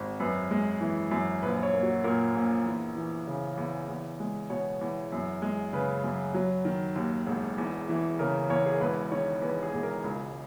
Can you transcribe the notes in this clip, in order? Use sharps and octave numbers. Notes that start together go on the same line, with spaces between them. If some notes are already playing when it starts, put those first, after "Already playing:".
Already playing: G#1
F#2 B4
G#3
E3
F#2
A#1 B4
C#5
A#3
F#4
A#2 A#4
A#1
E2
E3
C#3
E2
E2
G#3
B2 C#5
E2
F#2
G#3
C#3 B4
F#2
F#3
D#3
D#2
E1
E2
E3
C#3 A#4
E2 C#5
G#4
A#4
E1 B4
D#3 C#5
E2 B4
G#4
E1
A#4
C#2